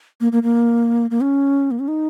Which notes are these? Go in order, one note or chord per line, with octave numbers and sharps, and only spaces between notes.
A#3
A#3
A#3
A#3
C#4
A#3
C#4
D#4